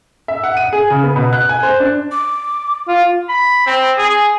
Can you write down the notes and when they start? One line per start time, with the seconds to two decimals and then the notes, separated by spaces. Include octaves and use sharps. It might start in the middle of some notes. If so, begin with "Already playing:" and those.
0.28 E5
0.44 F#5
0.57 D#7
0.73 G#4
0.90 C#3
1.04 B3
1.16 B2
1.33 F#6
1.49 G#5
1.63 C5
1.80 D4
2.11 D6
2.88 F4
3.29 B5
3.67 C4
3.98 G#4